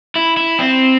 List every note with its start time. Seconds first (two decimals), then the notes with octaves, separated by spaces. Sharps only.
0.16 E4
0.37 E4
0.59 C4